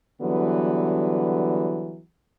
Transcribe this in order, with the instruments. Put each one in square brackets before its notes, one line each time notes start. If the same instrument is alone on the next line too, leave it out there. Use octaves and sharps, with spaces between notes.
[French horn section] D3 E3 F#3 G3 B3